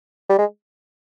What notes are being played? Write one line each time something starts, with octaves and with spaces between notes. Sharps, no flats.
G3
G#3